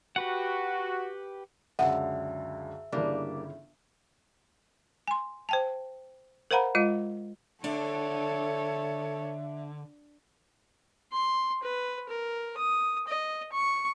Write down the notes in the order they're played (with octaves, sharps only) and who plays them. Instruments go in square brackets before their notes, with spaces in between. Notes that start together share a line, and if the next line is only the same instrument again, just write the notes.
[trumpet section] F#4 [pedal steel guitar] G4 B4 F#5
[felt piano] C#2 F#2 D3 [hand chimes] E5 [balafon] F#5
[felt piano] G1 C#3 E4 [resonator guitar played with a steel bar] G3 A#3 D4
[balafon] G#5 C6
C5 G5 A5
A#4 C5 F5 F#5 A#5 B5
G#3 F4 D#5
[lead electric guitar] D3 [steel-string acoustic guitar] D4 [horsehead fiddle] A4 C#5 [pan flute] E5
[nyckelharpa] C6
B4
A#4
D#6
D#5
C#6